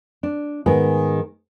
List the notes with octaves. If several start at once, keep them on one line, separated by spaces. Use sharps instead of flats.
D4
G#2 D#3 G#3 B3 G#4